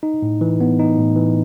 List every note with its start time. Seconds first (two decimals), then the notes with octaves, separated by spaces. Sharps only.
0.03 D#4
0.22 A2
0.41 E3
0.61 B3
0.79 D#4
0.98 A2
1.16 E3